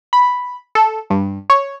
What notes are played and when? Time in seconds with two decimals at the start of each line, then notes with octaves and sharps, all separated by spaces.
0.13 B5
0.75 A4
1.10 G2
1.50 C#5